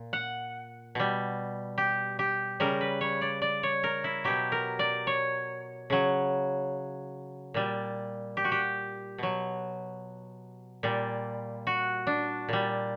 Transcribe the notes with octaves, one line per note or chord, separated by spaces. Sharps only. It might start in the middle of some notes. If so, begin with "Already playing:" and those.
Already playing: A#2
F#5
B2 G3
G4
G4
C#3 G3 A#4
B4
C#5
D5
D5
C#5
A#4
E4
B2 F#3 G4
A#4
D5
C#5
C#3 F#3
A#2 G3
G4
F#4
G4
B2 F#3
A#2 G3
F#4
D4
A#2 G3